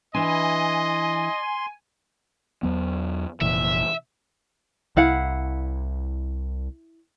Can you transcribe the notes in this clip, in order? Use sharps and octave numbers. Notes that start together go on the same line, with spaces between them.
E3 D4 D#5 G#5 C6
E2 F#3 B3
F1 A#2 E3 E5
C2 E4 F5 F#5